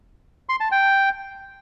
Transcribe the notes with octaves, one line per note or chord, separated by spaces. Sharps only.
C6
A5
G5